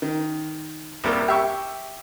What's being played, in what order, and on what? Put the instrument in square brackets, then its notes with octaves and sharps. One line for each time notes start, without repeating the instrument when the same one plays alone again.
[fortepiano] D#3
C2 C3 G3 A#3
G4 E5 C#6